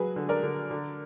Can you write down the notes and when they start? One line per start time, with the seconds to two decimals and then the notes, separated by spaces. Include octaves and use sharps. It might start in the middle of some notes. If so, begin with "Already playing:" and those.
Already playing: F#3 F#4 G#4 B4
0.16 D3
0.29 A#4 D5
0.43 D3
0.71 D3